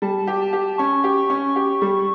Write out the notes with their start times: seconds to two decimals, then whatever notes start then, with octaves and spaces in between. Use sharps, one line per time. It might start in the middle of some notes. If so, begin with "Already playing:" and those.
0.02 G3 A5
0.27 G4
0.41 A5
0.53 G4
0.78 C#4 C#6
1.04 G4
1.17 C#6
1.30 C#4
1.56 G4
1.82 G3